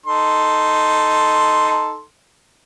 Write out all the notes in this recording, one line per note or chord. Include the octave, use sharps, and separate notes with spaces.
D#4 A4 C6